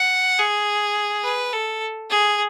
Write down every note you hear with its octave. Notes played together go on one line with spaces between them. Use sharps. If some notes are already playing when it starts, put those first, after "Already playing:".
Already playing: F#5
G#4
B4
A4
G#4